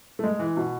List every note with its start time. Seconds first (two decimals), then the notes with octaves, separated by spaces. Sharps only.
0.19 A3
0.24 G#3
0.39 E3
0.57 B2